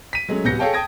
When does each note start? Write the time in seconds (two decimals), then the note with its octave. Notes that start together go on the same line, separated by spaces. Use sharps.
0.13 B6 D#7
0.28 F#3 G#3 A3 C#4
0.44 D1 C3 B3 G6 A#6 C#7
0.59 G#4 A4 C#5 F5 G5 A5
0.73 G5 A5 D#6 G#6 A#6 D7